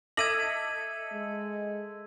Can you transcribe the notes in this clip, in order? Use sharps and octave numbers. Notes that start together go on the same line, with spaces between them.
A4 D#5 E5 D6 G#6 A#6 D#7 F#7
G#3